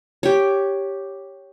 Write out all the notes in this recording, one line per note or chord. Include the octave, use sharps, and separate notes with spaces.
G4 C#5